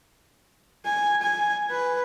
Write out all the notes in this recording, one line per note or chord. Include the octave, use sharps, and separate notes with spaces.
G#5
G#5
B4